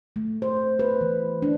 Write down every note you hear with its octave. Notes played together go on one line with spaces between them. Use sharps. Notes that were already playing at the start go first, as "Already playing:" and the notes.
A3
C5
B4
E3
D4